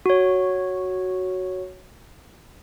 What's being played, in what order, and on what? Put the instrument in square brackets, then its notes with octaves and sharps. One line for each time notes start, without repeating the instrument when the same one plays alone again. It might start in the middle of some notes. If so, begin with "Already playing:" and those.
[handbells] F#4 C#5